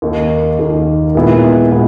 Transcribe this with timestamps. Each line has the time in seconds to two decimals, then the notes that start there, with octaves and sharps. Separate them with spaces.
0.02 D#2 D#3 A#3
0.59 D#2 D#3 A#3
1.15 A#2 G#3 B3 E4
1.72 A#2 G#3 B3 E4